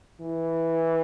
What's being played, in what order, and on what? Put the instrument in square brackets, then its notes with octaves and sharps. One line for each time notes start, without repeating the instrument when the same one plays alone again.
[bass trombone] E3